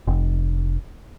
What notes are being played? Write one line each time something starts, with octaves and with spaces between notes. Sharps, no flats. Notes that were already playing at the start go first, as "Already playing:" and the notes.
F1